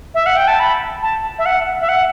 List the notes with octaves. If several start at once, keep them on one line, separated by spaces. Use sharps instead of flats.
E5
F#5
G5
A5
B5
A5
E5
F#5
E5
F#5